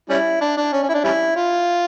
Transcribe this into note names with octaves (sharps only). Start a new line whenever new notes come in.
G3 C#4 E4
D4
D4
C#4
C#4
E4
D4
G3 C#4 E4
F4